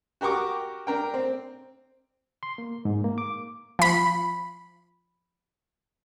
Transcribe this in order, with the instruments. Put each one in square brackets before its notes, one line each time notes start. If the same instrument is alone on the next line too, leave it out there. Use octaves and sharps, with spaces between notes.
[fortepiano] F#4 G4 A#4 C#6 D6
D4 A#4 G5
C4
[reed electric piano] C6
A#3
G#2
A#3
D6
[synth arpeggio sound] F3 B5